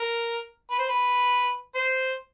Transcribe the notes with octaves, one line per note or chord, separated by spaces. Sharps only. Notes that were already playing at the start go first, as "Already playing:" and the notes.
Already playing: A#4
B4
C5
B4
C5